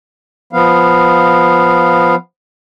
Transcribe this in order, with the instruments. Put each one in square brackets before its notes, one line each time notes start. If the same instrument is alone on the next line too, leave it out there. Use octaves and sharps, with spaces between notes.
[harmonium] F3 B3 F5